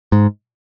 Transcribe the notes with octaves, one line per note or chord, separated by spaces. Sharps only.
G#2